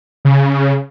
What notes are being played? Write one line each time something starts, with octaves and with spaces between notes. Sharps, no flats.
C#3